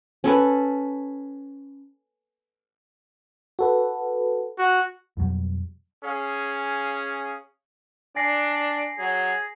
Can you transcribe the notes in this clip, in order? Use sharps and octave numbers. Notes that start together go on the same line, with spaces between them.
C#4 A4 B4
F#4 A4 B4
F#4
F2 B2 F#3 G3
C#4 G#4 F5
D4 D5 G#5 A#6 C7
F#3 G#4